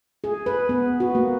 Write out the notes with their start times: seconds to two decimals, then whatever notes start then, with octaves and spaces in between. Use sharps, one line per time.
0.24 G#4
0.46 B4
0.69 B3
1.00 F#4
1.15 A#3